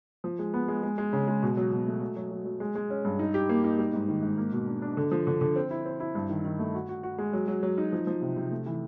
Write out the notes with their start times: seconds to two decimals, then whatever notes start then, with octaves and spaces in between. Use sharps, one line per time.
0.24 F3
0.39 G#3
0.54 B3
0.68 G#3
0.83 G#3
0.98 G#3
1.13 C#3
1.28 G#3
1.42 B2
1.57 F#3
1.72 B2
1.87 A3
2.01 F#3
2.16 F#3
2.31 F#3
2.45 F#3
2.60 G#3
2.75 G#3
2.90 C#4
3.04 G2
3.19 D#4
3.34 G4
3.49 A#3
3.64 D#4
3.78 G3
3.93 G#2
4.08 D#3
4.23 G#2
4.38 A#3
4.52 B2
4.67 D4
4.82 D4
4.97 D3
5.11 F3
5.27 D3
5.41 D3
5.56 C4
5.71 E4
5.86 C4
6.00 E4
6.15 G2
6.30 D#3
6.45 D#3
6.59 A3
6.74 F#4
6.89 F#4
7.03 F#4
7.18 G#3
7.33 F#3
7.48 F#3
7.63 F#3
7.78 D#4
7.92 F3
8.07 F3
8.22 C3
8.36 C3
8.51 A3
8.66 E3